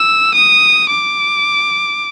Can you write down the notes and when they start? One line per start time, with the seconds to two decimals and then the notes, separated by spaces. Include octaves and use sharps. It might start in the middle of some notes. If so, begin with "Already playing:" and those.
Already playing: E6
0.35 D#6
0.90 D6